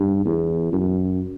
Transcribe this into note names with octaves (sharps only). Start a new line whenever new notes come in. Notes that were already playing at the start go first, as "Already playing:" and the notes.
Already playing: G2
E2
F#2